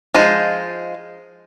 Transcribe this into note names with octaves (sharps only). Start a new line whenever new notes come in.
F3 G#3 D#4 F4